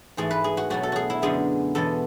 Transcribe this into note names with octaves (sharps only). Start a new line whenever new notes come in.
G#2 E3 A3 G#4
B4
G#4
F#4
B2 F#3 A3 F#4
A4
F#4 G#4
E4
F#2 D3 G#3 B3 G#4
E2 B2 G#3 B3 A4